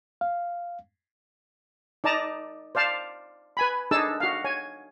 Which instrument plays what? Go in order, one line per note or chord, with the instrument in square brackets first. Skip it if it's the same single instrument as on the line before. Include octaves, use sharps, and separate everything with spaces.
[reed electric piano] F5
[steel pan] D#4 D5 A5 A#5 D#6
C5 D5 F5 A5
B4 G#5 B5
D4 D#4 G#4 A4 A5 E6
F#4 F5
C#5 G#5